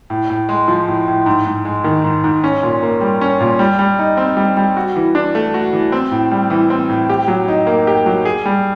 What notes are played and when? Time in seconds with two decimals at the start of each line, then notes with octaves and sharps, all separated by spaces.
0.10 A2
0.30 A2
0.49 G#3
0.68 F3
0.88 A2
1.08 A2
1.26 G#2
1.46 G#2
1.65 G#3
1.84 D#3
2.04 G#2
2.24 G#2
2.44 C#4
2.63 A#2
2.83 A#3
3.01 G3
3.21 C#4
3.41 A#2
3.59 G3
3.79 G3
3.99 D#4
4.17 C4
4.37 G3
4.57 G3
4.77 F#4
4.96 E3
5.15 D4
5.35 A3
5.54 F#4
5.73 E3
5.92 C4
6.11 A2
6.31 G3
6.50 E3
6.70 C4
6.90 A2
7.09 G4
7.28 F#3
7.48 D#4
7.67 A#3
7.87 G4
8.06 F#3
8.25 G#4
8.46 G3